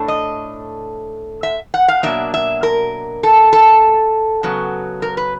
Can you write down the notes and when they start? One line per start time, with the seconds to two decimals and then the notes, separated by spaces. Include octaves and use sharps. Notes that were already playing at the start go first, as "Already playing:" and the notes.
Already playing: A2 A3 D4
0.08 D#5
1.43 E5
1.74 F#5
1.88 F5
2.03 B2 F#3 A#3 D4 E5
2.34 E5
2.63 A#4
3.23 A4
3.53 A4
4.43 C#3 F#3 B3
5.02 A#4
5.17 B4